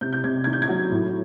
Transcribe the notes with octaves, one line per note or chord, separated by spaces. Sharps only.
C3 G6
G6
C3 G#6
D#3 G#6
G6
G#6
F#3
A2